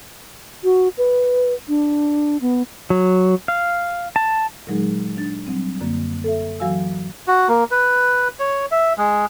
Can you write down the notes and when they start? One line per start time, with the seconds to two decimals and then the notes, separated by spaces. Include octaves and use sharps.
0.64 F#4
0.98 B4
1.68 D4
2.41 B3
2.90 F#3
3.48 F5
4.16 A5
4.67 A#2 D#3 F#3 G#3 D#4 G#4
5.17 D4 A6
5.47 F#3 G3 C4
5.81 F#2 D3 A#3
6.24 A4 E5
6.60 E3 F#3 F#4 F5 G#5 E6
7.28 F#4
7.48 A#3
7.71 B4
8.39 C#5
8.71 E5
8.98 G#3